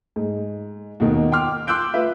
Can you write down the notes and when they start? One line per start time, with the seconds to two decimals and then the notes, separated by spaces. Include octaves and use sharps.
0.16 G#2
1.00 D#2 B2 D#3
1.32 G5 C6 D6 F6
1.67 C6 D6 E6 F#6 G6 D7
1.94 F4 B4 E5